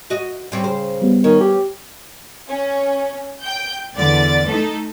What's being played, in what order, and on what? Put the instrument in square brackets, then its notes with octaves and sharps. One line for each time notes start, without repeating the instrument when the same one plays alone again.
[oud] F#4 D#5
G3 C4 C#4
[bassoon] C#3 [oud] C5
[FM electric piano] G3 B3
[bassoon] D#3 [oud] C#4
[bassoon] G4
[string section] C#4
G5 G6
E2 D3 D5 A6
A3 D#4 A4